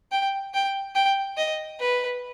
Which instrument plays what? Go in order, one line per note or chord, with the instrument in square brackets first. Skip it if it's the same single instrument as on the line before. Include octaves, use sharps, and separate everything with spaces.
[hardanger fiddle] G5
G5
G5
D#5
B4